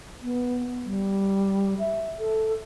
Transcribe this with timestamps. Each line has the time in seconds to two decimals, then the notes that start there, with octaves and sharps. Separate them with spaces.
0.23 B3
0.85 G3
1.79 E5
2.20 A4